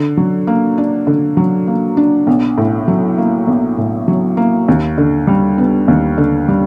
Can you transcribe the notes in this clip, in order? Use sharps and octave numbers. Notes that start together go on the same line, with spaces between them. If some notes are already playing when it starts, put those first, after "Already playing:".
Already playing: D3
F#3
A#3
D4
D3
F#3
A#3
D4
B1
A2
F#3
A#3
B1
A2
F#3
A#3
D#2
D3
G3
B3
D#2
D3
G3